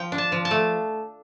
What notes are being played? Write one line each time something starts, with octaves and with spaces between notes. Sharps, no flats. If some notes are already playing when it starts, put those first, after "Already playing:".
Already playing: F3 G5
D4
A5
F3
A5
A3